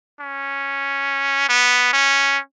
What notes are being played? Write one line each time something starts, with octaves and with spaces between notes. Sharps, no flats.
C#4
B3
C#4